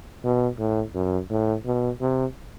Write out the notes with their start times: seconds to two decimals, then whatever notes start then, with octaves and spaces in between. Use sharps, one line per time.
0.23 B2
0.58 A2
0.94 F#2
1.30 A2
1.65 B2
2.01 C3